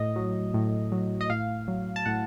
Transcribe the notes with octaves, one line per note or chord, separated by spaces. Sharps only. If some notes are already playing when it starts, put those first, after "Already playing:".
Already playing: A2 D#5
F#3
A2
F#3
D#5
A2 F5
F#3
A5
A2 F#5